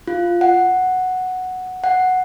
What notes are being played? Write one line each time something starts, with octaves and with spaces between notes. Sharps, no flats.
F4
F#5
F#5